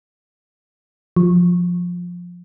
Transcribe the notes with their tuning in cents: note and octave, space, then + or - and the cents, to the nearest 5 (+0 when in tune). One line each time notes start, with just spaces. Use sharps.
F3 +15